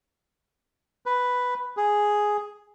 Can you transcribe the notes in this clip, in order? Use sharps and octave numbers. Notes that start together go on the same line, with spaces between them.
B4
G#4